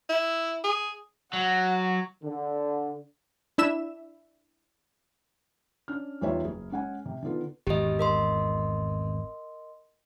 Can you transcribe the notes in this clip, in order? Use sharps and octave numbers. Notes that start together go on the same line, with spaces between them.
E4
G#4
F#3 F#5
D3
D4 E4 E5 E7
C#4 D4 F6
E2 G3 D#4 F4 C#5 E5
F#1 G#4
G#3 C#4 F#5 G#5
C3
D3 D#3 B3 F4 A4
G#1 E2 G4 D#5
A#4 D#5 C6